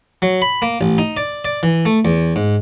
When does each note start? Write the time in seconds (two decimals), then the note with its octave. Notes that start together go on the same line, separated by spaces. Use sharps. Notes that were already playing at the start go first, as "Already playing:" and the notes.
0.22 F#3
0.42 B5
0.62 A#3
0.81 A1
0.98 D#4
1.17 D5
1.45 D5
1.63 E3
1.85 A3
2.05 E2
2.36 G#2